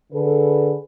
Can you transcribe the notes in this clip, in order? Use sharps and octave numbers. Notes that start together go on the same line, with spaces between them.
D3 G#4 A4 B4